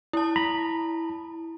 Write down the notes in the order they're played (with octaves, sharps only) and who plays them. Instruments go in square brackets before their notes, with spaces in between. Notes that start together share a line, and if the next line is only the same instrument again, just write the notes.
[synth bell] E4 A5
[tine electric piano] A#5 B5